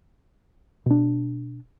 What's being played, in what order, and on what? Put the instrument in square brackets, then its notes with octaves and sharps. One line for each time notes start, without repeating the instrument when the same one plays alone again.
[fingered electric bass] B2 D4